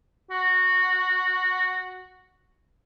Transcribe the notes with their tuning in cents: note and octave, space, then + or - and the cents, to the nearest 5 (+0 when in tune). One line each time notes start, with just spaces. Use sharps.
F#4 -5